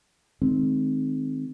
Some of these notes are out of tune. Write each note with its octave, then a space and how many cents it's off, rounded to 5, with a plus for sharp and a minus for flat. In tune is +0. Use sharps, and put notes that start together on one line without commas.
D#3 -5 G#3 +30 C4 +0